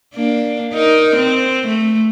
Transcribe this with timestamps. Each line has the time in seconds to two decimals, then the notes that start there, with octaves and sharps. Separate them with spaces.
0.15 A#3 D4
0.74 D#4 A#4
1.16 C4
1.67 A3